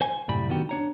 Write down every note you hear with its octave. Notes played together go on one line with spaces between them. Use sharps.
C5 G#5
C2 F#2 A2 G3 B5
D3 D#3 B3 F#4 G4
D4 C#5 A#5